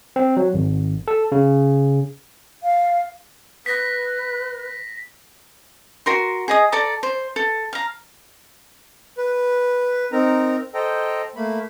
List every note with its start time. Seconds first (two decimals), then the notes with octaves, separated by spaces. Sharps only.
0.16 C4
0.37 F#3
0.54 G#1
1.08 A4
1.32 C#3
2.63 F5
3.66 B4 A#6 B6
6.06 F#4 A#4 C6
6.48 G#4 D#5 D#6
6.72 A4 D5 A5 A#5
7.03 C5
7.36 A4
7.73 F5 A#5
9.18 B4
10.12 C4 D#4 A#4 A#5
10.74 A4 C5 D#5 G5 A#5
11.36 A3 A#3 B5